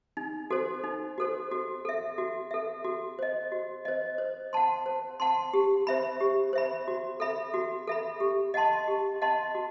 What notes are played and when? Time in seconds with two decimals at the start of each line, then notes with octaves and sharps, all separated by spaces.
0.17 D#4
0.50 F#4 A4 C5
0.84 D#4
1.18 F#4 A4 C5
1.51 F#4
1.85 A4 E5
2.18 F#4
2.51 A4 E5
2.84 F#4
3.19 C5 D#5
3.52 F#4
3.85 C5 D#5
4.18 C5
4.53 F#5 A5 C6
4.86 C5
5.20 F#5 A5 C6
5.54 G4
5.87 C5 E5 B5
6.21 G4
6.53 C5 E5 B5
6.88 F#4
7.20 A4 E5 B5
7.54 F#4
7.87 A4 E5 B5
8.20 G4
8.54 D#5 F#5 A5 C6
8.88 G4
9.22 D#5 F#5 A5 C6
9.55 F#4